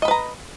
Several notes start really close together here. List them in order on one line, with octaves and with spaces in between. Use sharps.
D#5 B5 B4 A#5